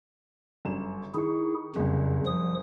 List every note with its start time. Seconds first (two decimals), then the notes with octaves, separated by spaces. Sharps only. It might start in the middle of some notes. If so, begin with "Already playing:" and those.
0.65 G1 F#2 E7
1.14 D#3 E4 G#4 C#6
1.76 F#1 C2 F2 C#3
2.26 F3 D#6